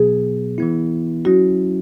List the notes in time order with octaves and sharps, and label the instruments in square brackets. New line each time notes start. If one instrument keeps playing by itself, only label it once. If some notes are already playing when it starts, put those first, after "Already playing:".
Already playing: [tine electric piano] B2 F#3 B3 [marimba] G#4
[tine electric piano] E3 B3 E4
[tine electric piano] F#3 C#4 E4 [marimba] F#4